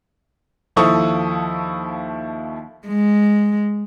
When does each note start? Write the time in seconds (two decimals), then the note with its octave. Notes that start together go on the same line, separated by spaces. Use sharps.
0.76 D#2 F3 E4 A4 C#6 D#6
2.87 G#3